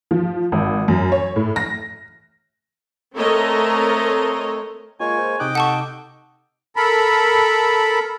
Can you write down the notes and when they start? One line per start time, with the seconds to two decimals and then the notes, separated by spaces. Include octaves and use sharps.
0.11 F3
0.52 G#1
0.88 F#2
1.12 C#5
1.36 A2
1.56 A#6
3.16 A3 C4 A4 A#4 C#5 D#5
5.00 G#3 A#3 F4 C#5 G#5
5.19 C5
5.40 C3 D#4 D#5 G5 D6 F#6
5.55 A4 F#5 A5 C#6
6.76 A4 A#4 B5